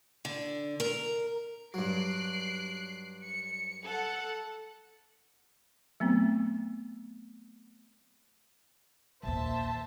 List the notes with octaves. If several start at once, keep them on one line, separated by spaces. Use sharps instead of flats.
D3
A#4
G2 F#3 F#6 C7 D7
C#7
A4 F#5
F#3 A3 B3 C4
A#1 D#2 C5 E5 A5